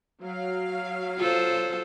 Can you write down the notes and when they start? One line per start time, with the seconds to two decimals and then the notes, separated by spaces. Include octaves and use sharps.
0.22 F#3 F5
1.18 F4 A4 C5